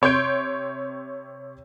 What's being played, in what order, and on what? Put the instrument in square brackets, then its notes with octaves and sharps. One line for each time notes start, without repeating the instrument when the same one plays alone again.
[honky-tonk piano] C3 C#5 C6 G6 D7